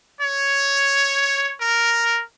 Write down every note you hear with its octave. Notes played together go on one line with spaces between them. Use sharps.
C#5
A#4